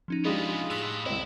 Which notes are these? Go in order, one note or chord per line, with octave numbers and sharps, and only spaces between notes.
F3 C#4 D#4
C#3 G#3 B3 D4 F4 G4 D#5 B5
A2 E6 F#6 B6
C2 C4 E4 C5 D#5